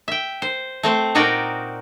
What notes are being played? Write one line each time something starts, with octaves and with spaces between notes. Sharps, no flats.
E5 G5
C5
A3 C4 C5
A#2 D#4 F#4 A#4 D5 G5